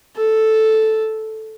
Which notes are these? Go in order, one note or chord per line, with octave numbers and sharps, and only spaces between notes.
A4